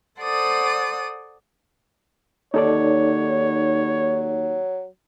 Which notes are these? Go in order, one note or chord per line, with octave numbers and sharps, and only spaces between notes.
A4 C5 D5 F#5 D#6
D#2 F#3 D#4 A4 C#5 D5